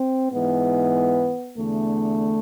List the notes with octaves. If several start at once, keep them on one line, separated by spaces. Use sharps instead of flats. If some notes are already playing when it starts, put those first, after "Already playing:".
Already playing: C4
G#2 E3 B3
E2 D3 A3